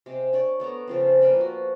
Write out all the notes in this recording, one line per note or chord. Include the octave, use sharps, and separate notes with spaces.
C3 G#3
D4 C#5 D5
A3 B3 D5 A#5
C#3 F3 C4
A#3 B4 D5 G5
F3 F#4